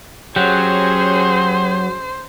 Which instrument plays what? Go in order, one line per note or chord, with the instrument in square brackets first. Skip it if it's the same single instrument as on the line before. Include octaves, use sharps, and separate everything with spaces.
[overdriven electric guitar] F#3 [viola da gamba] C#4 G#4 [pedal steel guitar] G4 F#5 [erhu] C5